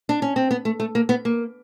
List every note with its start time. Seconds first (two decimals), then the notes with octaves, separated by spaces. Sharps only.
0.09 D4
0.22 C#4
0.36 C4
0.51 B3
0.65 A3
0.80 A3
0.95 A#3
1.09 B3
1.25 A#3